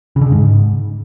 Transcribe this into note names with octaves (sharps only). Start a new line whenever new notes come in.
C#3
D3
C#3
G#2